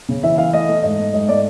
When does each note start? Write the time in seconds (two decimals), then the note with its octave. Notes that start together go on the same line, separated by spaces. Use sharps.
0.09 C#3
0.23 E3 E5
0.38 E3 F5
0.53 A3 D#5
0.68 A3
0.83 G#2 D#5
0.98 A3
1.13 G#2 D#5
1.28 A3 D5